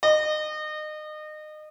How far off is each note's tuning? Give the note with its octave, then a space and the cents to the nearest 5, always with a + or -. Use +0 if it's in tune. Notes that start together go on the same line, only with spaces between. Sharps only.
D#5 -30